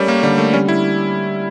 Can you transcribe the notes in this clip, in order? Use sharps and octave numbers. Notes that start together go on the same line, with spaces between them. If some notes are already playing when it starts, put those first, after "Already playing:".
Already playing: G3 A3 C#4 A#4
A#3
D3 G3
A3
G3 C#4
E4